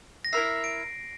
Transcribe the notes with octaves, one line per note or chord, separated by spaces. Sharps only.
A#6
E4 A#4 E5 C7
D7